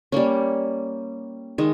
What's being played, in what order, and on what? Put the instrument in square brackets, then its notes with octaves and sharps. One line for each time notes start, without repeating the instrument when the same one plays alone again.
[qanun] G3 A#3 C#4
D#3 G#3